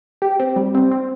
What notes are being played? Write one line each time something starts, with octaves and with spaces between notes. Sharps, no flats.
G4
C4
G3
C4
C4